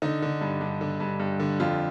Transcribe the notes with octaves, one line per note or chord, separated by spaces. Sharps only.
D3 D#4
D3
G2
G2
D3
G2
G2
D3
F2 F4